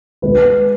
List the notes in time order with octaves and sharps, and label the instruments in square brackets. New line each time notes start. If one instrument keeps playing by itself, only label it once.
[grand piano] G#3 B4